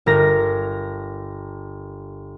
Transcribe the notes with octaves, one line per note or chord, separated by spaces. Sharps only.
G1 A#4 A#6